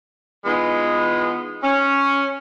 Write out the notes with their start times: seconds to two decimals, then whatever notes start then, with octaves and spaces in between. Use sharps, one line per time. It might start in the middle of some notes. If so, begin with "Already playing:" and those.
0.46 E3 G#3 B3 D#4 F4
1.63 C#4